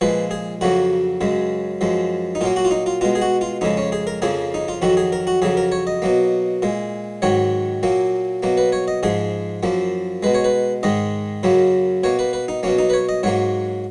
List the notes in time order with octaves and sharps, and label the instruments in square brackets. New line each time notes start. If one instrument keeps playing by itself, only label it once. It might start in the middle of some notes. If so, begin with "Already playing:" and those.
[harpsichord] A#2 F3 G#3 B4
G#4
F2 C#3 F#3 A#3 F#4
F#2 C#3 G#3
F#2 F3 G#3
D#4
A#2 F#3 A#3 F4
F#4
F4
D#4
F4
B2 G#3 F4
G#4
F#4
F4
F2 C#3 G#3 D#4
C#4
G#4
A#4
F2 C#3 F3 A#3 G#4
D#4
F4
F2 D#3 F#3 F#4
G#4
A#4
F#4
F2 C#3 F#3 G#4
A#4
C#5
D#5
B2 F#3 A#3
A#2 G#3
G#2 D#3 F#3 C#5
A#2 F#3 A#3
B2 F#3 A#3
B4
C#5
D#5
G#2 F3 G#3 G#4
F#2 F3 A#3
B2 G#3 B4
C#5
B4
G#2 D#3 G#3 D#5
F#2 C#3 F#3 A#3
B2 A#3 C#5
B4
B4
D#4
B2 F#3 A#3 C#4
D#4
B4
C#5
D#5
G#2 F#3 A#3 C#5